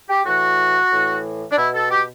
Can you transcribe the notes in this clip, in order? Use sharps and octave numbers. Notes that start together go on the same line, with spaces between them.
G4
A2 E3 F#4
A2 E3
D4
B2 E4
A4
G4